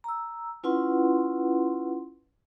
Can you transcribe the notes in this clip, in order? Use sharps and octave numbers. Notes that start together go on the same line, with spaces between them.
A#5 E6
C#4 E4 F4 B4 F#5 C6